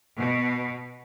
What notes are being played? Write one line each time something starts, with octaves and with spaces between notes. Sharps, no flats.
B2